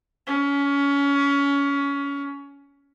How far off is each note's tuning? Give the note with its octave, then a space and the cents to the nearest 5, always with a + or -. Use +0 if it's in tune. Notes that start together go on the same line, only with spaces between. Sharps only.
C#4 +25